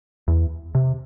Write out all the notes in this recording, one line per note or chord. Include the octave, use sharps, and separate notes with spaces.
E2
C3